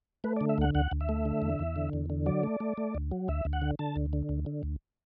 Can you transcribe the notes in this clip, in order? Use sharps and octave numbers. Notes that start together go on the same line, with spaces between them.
A3 B4
D5
D3
E5
D2 F#5
D2 F#5
D2
E5
A3
D3
E2
E2
D3
E2
D3
F#3 D5
A3
A3
A3
D2
F#3
D2 E5
D2
F#5
D3
D3 A5
D2
D3
D2
D3
D2